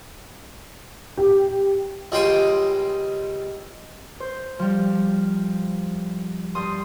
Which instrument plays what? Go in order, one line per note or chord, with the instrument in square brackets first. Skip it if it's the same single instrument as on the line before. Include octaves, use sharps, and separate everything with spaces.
[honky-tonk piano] G4
[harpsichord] C#2 G3 G#3 G5 C6 D#6
[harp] C5
F3 G3
G2 C6 D#6